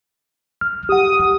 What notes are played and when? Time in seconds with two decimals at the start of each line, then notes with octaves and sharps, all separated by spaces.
0.61 F6
0.89 G4 F#5 D#6